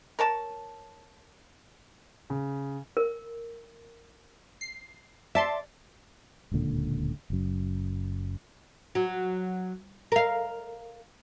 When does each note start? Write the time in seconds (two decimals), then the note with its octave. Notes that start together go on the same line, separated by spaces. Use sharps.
0.19 A#4 C#5 A5
2.30 C#3
2.97 A#4
4.61 C7
5.35 D5 E5 A5 C6
6.52 D1 C#2 A#2 D3
7.30 F#1 F#2
8.95 F#3
10.12 A#4 F5